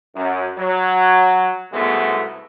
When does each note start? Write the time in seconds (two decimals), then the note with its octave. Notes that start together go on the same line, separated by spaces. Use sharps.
0.15 F#2
0.58 F#3
1.72 C2 G#2 B2 G#3 A3 B3